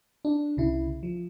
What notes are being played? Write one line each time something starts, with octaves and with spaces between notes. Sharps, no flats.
D4
C2 C#3 E4
F3